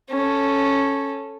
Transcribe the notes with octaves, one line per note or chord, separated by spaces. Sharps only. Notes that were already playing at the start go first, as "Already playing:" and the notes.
C#4 A4